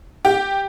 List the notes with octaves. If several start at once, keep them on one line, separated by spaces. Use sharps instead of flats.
G4